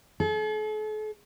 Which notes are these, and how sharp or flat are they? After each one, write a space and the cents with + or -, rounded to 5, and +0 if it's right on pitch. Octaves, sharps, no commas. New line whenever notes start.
A4 -45